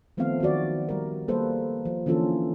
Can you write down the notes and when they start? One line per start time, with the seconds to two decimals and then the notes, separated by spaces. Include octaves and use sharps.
0.17 D#3 F3 A3 B3 C4 F5
0.40 D#3 F#3 F#4 D5
0.89 G3 A#4
1.28 G3 A#3 A4 B4 C5
1.85 F3
2.06 D3 E3 A#3 C#4 F4 A4